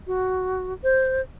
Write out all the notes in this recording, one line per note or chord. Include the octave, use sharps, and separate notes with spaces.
F#4
C5